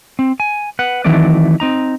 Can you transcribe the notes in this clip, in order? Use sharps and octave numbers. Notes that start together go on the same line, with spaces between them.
C4
G#5
B4 F#5
D#3 E3 F#3 A3 C4 D5
C4 D#4 A#5